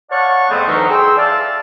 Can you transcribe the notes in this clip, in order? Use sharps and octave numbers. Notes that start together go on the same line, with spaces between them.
C#5 D5 F5 F#5 A5 C#6
F2 G#3 A3 B3 C4
D2 E3 F#3 D#4 A#4 C#6
G#4 G5 C6 E6
D5 E5 F5 A5